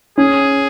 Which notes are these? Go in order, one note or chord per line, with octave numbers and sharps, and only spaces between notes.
C#4 G#4